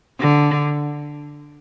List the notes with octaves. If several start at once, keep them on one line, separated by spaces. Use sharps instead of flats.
D3